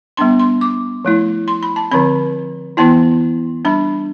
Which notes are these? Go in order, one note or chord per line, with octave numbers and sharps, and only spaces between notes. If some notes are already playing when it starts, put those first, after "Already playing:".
G3 B3 D4 C6
C6
D6
F3 A3 E4
C6
B5
A5
D3 F3 C4 B5
E3 B3 E4 A5
G3 D4 B5